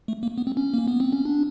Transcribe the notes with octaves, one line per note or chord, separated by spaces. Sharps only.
A3
A#3
B3
C4
C#4
A#3
B3
C4
C#4
D4